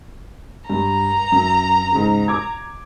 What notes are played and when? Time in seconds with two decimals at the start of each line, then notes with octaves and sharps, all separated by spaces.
0.70 G2 A#5
1.32 F#2
1.92 G#2 C#3
2.28 D6 G#6